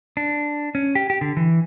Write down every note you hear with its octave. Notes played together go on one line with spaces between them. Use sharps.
D4
C#4
G4
G4
D3
E3